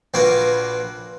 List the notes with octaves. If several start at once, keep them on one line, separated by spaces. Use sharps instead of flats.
A#1 A#3 F#4 B4